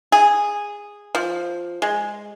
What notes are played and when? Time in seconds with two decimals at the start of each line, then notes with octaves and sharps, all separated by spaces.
0.12 G#4
1.15 F3
1.82 G#3